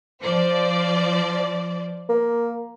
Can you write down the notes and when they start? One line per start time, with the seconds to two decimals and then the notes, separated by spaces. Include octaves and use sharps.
0.22 F3 C5 D5
2.09 A#3